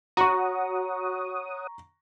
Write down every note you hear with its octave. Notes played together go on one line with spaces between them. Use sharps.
F#4 C#5 F#5 A#5 C#6 D#6